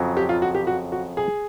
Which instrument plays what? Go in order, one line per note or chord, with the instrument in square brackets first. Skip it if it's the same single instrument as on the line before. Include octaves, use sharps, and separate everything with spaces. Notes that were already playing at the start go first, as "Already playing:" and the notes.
Already playing: [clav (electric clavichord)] F2 C#3 F#3
[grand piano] G4
F4
F#4
G4
F#4
F#4
G#4